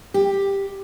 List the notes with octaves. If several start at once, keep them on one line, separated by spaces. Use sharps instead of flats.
G4